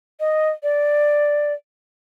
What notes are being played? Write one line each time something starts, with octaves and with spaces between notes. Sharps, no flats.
D#5
D5